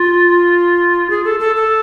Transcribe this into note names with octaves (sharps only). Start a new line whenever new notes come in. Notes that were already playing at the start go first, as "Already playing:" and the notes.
Already playing: F4
G#4
A4
A4
A4